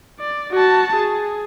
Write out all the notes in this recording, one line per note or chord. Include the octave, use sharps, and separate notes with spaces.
D5
F#4 A5
G#4